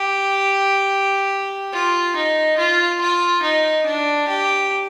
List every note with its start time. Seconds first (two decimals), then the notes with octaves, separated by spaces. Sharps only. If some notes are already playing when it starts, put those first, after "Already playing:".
Already playing: G4
1.73 F4
2.16 D#4
2.58 F4
3.01 F4
3.42 D#4
3.86 D4
4.28 G4